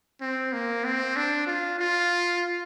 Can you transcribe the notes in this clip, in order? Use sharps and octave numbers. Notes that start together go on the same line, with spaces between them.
C4
A#3
C4
D4
F4
F4